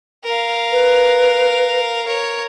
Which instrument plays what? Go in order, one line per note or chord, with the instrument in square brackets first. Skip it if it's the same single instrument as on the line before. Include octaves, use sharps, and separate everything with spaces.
[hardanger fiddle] A#4 F5
[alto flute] B4
[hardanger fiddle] A#4 C#5